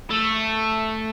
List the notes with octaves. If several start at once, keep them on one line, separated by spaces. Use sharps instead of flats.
A3